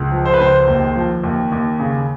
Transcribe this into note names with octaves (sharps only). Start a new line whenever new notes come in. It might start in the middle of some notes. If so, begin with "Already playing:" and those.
Already playing: C#2
F3
C5
B4
C#2 C5
D#2
F3
D#2
D#2
C#3